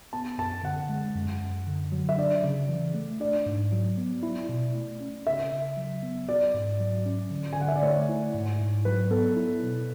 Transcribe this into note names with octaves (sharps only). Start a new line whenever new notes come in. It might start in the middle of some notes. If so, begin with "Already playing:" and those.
B3 A5
F#2 A5
D3 F#5
G#3
F#2
F#2
D3
F#3
E5
D4 D5
C#3
E3
A3
D4 D5
G#2
F#3
B3
E4
B2
A3
C#4
C#3 E5
C#3
F#3
B3
F#4 D5
G#2
F#3
C#4
D3
G#5
D3 F#5
E5
D5
A3 C#5
E4
G#2
G#2
F#3 B4
B3 A4
E4
B2